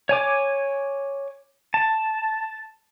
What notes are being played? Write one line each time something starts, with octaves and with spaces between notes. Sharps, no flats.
C#5 G#5 D6
A5